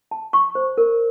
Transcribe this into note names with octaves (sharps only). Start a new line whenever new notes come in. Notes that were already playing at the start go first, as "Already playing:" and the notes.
A5
C#6
C5
A#4